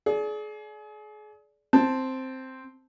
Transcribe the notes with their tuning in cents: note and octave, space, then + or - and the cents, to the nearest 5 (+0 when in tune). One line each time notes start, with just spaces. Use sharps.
G#4 +35 D5 -15
C4 +0 A5 +0